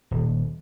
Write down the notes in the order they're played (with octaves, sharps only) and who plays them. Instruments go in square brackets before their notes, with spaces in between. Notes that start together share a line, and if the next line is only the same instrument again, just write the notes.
[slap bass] D#1